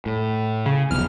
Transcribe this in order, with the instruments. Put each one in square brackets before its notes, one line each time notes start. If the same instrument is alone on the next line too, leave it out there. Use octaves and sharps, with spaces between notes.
[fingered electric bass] A2
[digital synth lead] C#3
[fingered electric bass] F1 B1 E2 [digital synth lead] F6